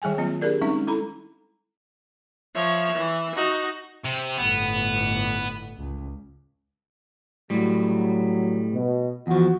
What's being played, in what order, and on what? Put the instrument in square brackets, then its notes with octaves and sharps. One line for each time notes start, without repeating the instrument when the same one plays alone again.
[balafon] D#3 G3 G#4 G5 G#5
F#3 A#3 C4 F4 D#5
D4 G4 G#4 A#4 D5
G3 G#3 C4 C#4 D#4
E4 A4 A#5 B5
[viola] F3 C#5 [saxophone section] E5
[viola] E3
D#4 F#4
[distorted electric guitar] C3
[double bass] G1 A2 [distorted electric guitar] B3
[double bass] C#2
[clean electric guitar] A2 G3 [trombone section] F#3
[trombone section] B2
[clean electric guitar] E2 F3 [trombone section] F#4